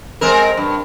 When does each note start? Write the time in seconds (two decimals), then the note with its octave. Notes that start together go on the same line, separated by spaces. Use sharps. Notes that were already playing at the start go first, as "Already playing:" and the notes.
0.21 G#3 C4 A#4
0.57 G2